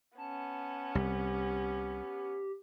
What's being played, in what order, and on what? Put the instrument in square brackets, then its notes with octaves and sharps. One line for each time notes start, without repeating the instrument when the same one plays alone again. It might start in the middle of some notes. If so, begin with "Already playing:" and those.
[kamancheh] B3 C#4 [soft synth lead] A5
[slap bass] C2 [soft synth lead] G4